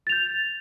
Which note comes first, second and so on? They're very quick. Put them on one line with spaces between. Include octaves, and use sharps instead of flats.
A6 F7 G6